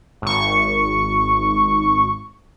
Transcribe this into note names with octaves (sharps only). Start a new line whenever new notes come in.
G#1 C#6